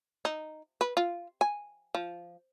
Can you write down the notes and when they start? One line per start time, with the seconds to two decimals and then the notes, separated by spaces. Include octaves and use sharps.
0.25 D#4
0.81 B4
0.97 F4
1.41 G#5
1.95 F3